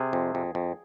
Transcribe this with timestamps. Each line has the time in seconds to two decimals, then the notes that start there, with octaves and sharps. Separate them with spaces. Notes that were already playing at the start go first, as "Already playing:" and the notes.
Already playing: C3 G#4
0.13 F2
0.35 F2
0.55 F2